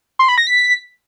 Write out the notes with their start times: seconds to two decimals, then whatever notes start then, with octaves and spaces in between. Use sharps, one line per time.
0.19 C6
0.28 B5
0.38 A#6
0.47 B6